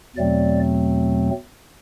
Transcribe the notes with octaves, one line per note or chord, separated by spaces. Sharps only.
E2 B2 F#3 A3 C4 D5